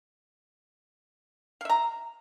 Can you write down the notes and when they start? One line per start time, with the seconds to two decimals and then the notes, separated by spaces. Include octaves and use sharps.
1.61 F5
1.65 E5
1.70 A#5